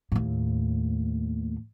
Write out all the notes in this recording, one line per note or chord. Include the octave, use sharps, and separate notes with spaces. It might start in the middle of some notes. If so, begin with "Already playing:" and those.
D#2 A2